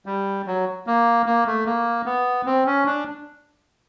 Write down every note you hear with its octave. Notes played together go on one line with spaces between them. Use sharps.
G3
F#3
A#3
A#3
A3
A#3
B3
C4
C#4
D4